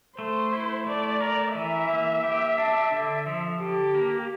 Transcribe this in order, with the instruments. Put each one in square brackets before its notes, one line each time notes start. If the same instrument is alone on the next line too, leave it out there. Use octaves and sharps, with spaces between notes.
[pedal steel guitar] A3 [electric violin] C5
[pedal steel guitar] E4
[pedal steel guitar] A3 [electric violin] D5
[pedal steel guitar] A#4
[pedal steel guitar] E3 [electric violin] E5
[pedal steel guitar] A#3
G4
D4
D3
F3
[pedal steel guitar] D3 [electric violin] G4
[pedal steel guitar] A#3